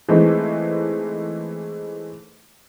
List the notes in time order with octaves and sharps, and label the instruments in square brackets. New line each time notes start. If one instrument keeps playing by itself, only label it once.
[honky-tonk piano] E3 G#3 A3 C4 D#4